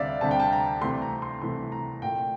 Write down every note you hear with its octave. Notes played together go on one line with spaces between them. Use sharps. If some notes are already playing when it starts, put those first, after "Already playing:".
Already playing: D2 C3 G3 D5 E5 F5
D2 C3 G3 A5
G5
A5
A#5
C2 C3 E3 A3 C6
A#5
C6
C2 C3 E3 A3 C6
A#5
A#2 A3 G5